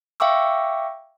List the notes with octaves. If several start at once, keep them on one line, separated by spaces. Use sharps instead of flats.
E5 F5 G5 C#6 D6 E6